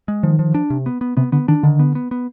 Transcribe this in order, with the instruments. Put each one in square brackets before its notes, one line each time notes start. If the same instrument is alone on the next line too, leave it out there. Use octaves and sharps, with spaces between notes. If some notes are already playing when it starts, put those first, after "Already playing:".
[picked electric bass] G#3
[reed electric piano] D#3 [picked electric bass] F3
[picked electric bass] F3
D4
C3
B3
B3
[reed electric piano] C3 [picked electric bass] B3
[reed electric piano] D3 [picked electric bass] B3
[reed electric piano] D#3 [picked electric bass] D4
[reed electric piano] D3 [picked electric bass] D#3
[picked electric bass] B3
B3
B3